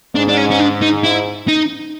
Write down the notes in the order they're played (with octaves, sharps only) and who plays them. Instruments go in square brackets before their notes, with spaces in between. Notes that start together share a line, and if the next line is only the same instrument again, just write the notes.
[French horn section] G#2 [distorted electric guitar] D4
[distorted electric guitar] D4
C#4
C#4
D4
D#4
E4
D#4